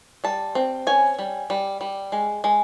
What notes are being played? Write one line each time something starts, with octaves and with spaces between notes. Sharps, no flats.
G3 A5
C4
C#4 G#5
G3
G3
G3
G#3
G#3